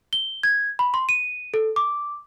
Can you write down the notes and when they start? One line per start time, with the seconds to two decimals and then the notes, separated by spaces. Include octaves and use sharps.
0.13 G7
0.43 G#6
0.79 B5
0.94 C6
1.09 D#7
1.54 A4
1.76 D6